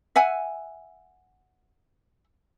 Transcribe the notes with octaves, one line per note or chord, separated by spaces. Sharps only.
E5 F#5 G#5